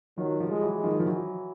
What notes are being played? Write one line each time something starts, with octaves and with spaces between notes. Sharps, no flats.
D#3 F3 F#3
F3 G3
G#3
E3 F#3
G#3
D#3 F3
F3
E3 F#3